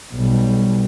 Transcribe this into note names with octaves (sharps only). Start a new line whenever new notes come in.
B1 G3